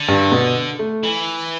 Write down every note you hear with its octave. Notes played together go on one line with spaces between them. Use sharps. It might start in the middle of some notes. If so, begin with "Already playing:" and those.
Already playing: D3
G2
B2
A3
E3